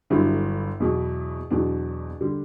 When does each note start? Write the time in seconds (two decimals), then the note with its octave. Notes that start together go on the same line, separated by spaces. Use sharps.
0.10 G1 G2 D3 F#3 E4
0.80 E2 B2 F#3
1.51 E2 B2 F#3 D4
2.21 D3 G3